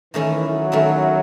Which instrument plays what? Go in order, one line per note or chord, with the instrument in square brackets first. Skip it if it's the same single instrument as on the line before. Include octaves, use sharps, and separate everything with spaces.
[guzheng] D#3 A3 C#4 E4 [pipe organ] E3
[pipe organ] F#3
[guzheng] D#3 A3 C#4 E4